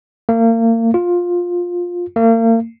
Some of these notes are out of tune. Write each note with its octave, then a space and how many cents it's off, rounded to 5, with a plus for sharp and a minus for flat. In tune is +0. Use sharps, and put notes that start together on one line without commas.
A#3 -35
F4 +15
A#3 -40